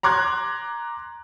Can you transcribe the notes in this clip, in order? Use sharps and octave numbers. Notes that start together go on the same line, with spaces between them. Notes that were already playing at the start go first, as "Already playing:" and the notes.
A#5 C6 D6 F#6 G#6